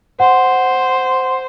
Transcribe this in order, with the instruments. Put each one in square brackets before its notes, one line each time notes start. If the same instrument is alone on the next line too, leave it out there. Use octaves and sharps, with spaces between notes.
[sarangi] C5 [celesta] F#5